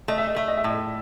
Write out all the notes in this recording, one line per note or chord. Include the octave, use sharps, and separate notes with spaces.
A3 D#5
E5
D#5
A3 E5
D#5
E5
A2 D#5